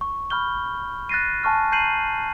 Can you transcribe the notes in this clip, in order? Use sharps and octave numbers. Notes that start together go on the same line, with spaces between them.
C#6
B5 C#6 F6 G6 G7
F#6 A6 A#6 C7 D#7
G#5 A5 C#6 F6
A#5 G6 C7 D#7 F#7